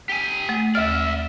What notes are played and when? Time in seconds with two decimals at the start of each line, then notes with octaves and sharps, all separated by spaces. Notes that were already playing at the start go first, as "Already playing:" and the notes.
0.09 G4 G#5
0.49 A3
0.75 D#2 D5 E5 F6